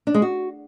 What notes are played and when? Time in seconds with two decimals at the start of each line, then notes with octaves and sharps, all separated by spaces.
0.07 D4
0.14 G#3
0.22 F#4